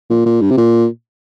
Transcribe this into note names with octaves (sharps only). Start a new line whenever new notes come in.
A#2
A#2
G2
C3
A#2